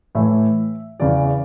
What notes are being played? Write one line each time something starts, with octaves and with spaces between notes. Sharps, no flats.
A2 E3 E5
E2 C#3 E3 D5